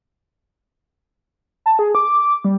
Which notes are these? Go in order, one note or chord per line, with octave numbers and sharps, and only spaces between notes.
A5
G#4
D6
G3